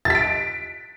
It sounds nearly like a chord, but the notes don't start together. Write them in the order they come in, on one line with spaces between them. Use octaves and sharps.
A6 B6 D7